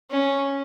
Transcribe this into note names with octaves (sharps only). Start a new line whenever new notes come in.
C#4